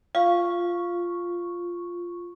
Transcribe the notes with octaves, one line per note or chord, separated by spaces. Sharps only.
F4 F5 C#6